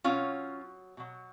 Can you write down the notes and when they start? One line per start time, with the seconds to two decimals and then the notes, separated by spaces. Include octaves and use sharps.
0.04 B2 F#3 C#4 F4
0.97 B2 F#3